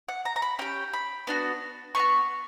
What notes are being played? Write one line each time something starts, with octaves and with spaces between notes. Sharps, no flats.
F#5
A#5
A#5
B5
C#4 G4 G5
B5
B3 D4 F#4
B3 D4 F#4 C#6